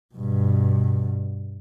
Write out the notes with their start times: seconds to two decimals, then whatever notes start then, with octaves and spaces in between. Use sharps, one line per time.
0.15 G2 B2